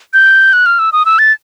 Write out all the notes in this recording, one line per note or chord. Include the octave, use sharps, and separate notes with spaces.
G6
F#6
F6
E6
D#6
E6
A6